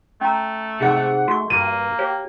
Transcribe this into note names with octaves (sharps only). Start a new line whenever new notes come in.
A3 C#4 A#5
G#2 C3 F#5
A3 F#4 C#6
G2 A#3 D#7
G4 C#5